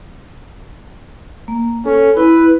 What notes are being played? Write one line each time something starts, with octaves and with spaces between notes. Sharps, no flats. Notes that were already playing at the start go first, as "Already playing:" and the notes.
A#3
C#4 A4
E4 B4